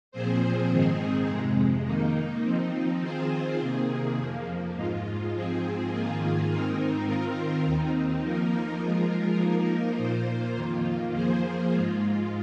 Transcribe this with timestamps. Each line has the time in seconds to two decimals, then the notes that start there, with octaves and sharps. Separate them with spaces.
0.12 A#2 F3 C4 G#4 C5
0.69 G#2 D#3 C4 D#4 G#4
1.27 F2 C3 G#3
1.85 D#3 A#3 D#4
2.43 F3 C4 D#4
3.01 D#3 C4 F4 G#4 C5
3.59 C3 D#3 A#3 G#4
4.16 F2 F3 A#3
4.75 G#2 G#3 F4
5.32 G#2 F3 C4 G#4
5.91 G#2 D#3 A#3 F4 G#4
6.49 G#2 D#3 C4 D#4 A#4
7.06 D#3 C4 F4 A#4
7.65 D#2 D#3 C4 D#4
8.23 F3 A#3 D#4 A#4
8.81 F3 G#3 F4 A#4
9.38 F3 A#3 D#4 A#4
9.97 A#2 A#3 F4 C5
10.55 F2 D#3 A#3 F4
11.12 F3 A#3 G#4 C5
11.70 G#2 G#3 F4